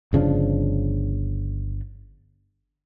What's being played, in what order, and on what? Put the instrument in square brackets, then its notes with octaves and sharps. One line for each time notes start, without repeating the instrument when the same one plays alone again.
[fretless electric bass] G1 C#3 F3 D4